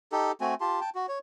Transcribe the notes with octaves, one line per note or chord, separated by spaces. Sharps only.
D#4 G4 A4
A3 C4 F#4 G#5
F4 G4 A5 C6
G5 A5
F#4
C#5